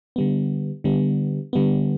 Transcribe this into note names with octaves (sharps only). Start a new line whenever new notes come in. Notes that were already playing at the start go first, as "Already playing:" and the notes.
D3 G3 B3
D3 G3 B3
D3 G3 B3